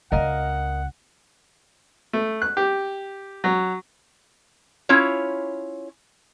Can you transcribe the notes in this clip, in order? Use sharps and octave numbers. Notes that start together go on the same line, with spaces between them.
C#2 C4 A#4 D#5 F5 F#5
A3
F#6
G4
F#3
C#4 E4 F4 C#5